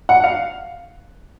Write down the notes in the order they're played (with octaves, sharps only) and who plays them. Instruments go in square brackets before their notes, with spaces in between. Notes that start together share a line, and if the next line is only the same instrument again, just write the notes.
[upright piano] F#5
F5